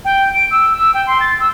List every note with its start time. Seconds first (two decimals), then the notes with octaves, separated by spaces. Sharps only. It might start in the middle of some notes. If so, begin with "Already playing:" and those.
0.04 G5
0.34 D7
0.50 E6
0.77 E6
0.93 G5
1.06 C6
1.20 A6
1.39 E6